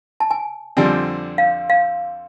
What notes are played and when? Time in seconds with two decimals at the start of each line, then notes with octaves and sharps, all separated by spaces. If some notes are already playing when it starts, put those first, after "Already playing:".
0.20 A5
0.31 G#5
0.77 F2 D3 G3 C4 G#5
1.38 F5
1.70 F5